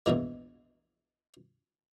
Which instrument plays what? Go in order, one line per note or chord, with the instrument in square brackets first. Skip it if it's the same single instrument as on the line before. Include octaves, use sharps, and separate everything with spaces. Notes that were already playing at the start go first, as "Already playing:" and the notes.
[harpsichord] A#1 E2 G#2 E3 G#3